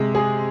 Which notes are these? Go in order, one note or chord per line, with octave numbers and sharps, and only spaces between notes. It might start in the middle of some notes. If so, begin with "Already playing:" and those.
Already playing: C3 G#3
G#4